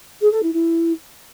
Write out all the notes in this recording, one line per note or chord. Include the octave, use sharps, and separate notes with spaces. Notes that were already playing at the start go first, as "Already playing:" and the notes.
G#4
A4
E4
E4